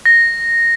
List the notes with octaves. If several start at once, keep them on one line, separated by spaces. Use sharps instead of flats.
A#6